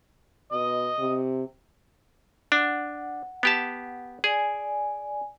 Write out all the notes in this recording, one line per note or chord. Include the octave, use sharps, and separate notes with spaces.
B2 D#5
C3
D4 F#5
B3 G4 A5
G#4 D5 G#5